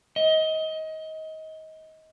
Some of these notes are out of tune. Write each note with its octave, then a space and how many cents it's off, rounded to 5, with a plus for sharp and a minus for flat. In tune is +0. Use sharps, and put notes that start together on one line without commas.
D#5 +25